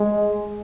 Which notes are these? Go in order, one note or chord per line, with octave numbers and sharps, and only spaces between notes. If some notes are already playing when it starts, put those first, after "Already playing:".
Already playing: G#3